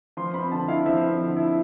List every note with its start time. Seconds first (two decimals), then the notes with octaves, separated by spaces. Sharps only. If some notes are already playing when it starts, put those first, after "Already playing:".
0.17 F3 C6
0.34 C4 B5
0.51 D3 A5
0.68 E4 F5
0.86 F3 E5
1.03 C4
1.20 D3
1.37 E4